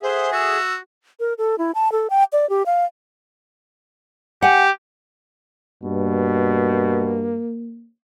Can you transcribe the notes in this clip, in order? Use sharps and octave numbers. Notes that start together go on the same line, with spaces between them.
G#4 A4 C5 E5 F#5
F#4 E6
A#4
A4
E4
A5
A4
G5
D5
G4
F5
G4 F#5 G#5
G2 B2 A#3